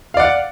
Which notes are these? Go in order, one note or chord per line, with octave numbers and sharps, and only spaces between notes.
D5 F5 F#5